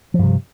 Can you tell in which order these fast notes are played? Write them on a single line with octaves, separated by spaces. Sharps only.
F3 G2 C3